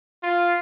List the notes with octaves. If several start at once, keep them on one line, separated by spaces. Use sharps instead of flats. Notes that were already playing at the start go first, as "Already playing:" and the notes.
F4